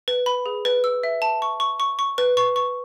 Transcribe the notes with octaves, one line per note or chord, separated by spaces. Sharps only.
B4
B5
G#4
B4
E6
E5
A5
C#6
C#6
C#6
C#6
B4
C#6
C#6